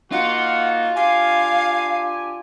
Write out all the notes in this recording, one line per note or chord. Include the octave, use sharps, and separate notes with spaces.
A#3 D#4 F4 F#4 F#5
D4 G4 F5 G#5